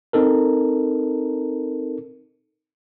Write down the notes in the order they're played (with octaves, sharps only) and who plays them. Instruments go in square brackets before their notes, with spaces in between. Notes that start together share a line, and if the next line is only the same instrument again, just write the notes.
[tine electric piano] C4 D#4 A4 A#4